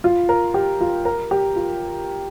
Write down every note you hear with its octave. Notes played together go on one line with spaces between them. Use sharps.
F4
A#4
G4
F4
A#4
G4
F4